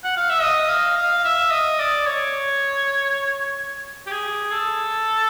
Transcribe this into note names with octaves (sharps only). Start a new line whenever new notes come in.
F#5
F5
E5
D#5
F5
F5
E5
D#5
D5
C#5
G4
G#4
A4